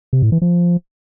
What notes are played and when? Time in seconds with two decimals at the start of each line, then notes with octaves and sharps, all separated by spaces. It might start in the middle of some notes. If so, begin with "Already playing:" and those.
0.13 C3
0.22 A2
0.32 E3
0.42 F3